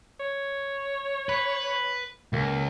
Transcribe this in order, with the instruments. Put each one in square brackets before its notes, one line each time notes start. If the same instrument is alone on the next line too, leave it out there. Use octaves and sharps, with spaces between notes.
[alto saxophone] C#5
[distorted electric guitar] B4
[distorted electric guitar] C#2 [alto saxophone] A#3